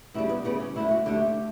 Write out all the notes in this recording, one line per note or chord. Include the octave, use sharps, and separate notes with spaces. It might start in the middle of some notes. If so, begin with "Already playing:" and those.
D2 C#3 G3 E4
B3
D2 C#3 G3 B3
C#4
D2 D3 A3 E4
F#4
D2 D3 A3 G4